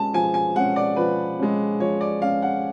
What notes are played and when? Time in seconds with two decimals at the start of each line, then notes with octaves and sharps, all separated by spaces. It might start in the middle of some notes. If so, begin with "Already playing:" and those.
Already playing: G#3 C#4 A5
0.14 F3 G#5
0.34 G#5
0.55 G#3 C#4 F#5
0.76 D5
0.96 F3 B4
1.39 G#3 C#4
1.79 F3 C#5
2.01 D5
2.21 G#3 C#4 F5
2.42 F#5